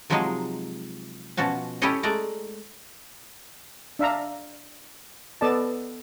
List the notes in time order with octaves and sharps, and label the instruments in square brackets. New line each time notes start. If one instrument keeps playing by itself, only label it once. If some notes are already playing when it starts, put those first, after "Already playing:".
[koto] C3 F3 F#3 G#3 D#4 G#4
B2 F3 C#4 F#4 A5
C#4 E4 G4 A4 C#5 D#5
G#3 A3 D5 A#5
[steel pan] D4 E5 F5 A#5
B3 A4 D5 D#5 A5